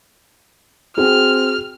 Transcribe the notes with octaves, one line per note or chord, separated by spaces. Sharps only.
C4 F#4 G#4 F6